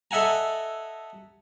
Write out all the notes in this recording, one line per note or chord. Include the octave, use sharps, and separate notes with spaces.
A4 D#5 E5 F#5 G#5 A#5